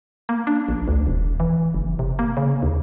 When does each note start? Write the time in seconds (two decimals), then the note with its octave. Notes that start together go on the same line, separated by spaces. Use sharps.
0.29 A#3
0.47 D4
0.68 A#1
0.88 D2
1.07 E1
1.40 E3
1.74 F#1
1.99 C3
2.19 A#3
2.37 C#3
2.63 D#2